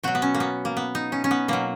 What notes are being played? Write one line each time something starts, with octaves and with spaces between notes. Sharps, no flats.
B2 F#3 F#4
B3
C#4
A#3
B3
A#3
B3
D#4
C#4
C#4
B3
B2 F#3 A#3